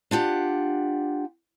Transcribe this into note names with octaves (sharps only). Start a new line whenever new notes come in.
D4 F4 G4 F#5